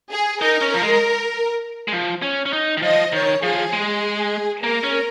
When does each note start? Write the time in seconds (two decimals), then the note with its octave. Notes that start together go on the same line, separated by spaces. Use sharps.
0.12 G#4
0.41 D#4 A#4
0.61 C#4
0.74 F3
0.82 G#3
1.88 G#3
1.92 F3
2.22 C#4
2.46 C#4
2.53 D#4
2.77 D#3
2.82 F3 D#5
3.12 D#3 C#5
3.43 F3 G#4
3.73 G#3
4.63 A#3 A#4
4.83 C#4